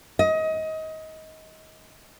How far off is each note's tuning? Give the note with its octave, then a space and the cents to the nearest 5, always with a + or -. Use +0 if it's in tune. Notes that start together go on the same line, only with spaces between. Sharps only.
D#5 +25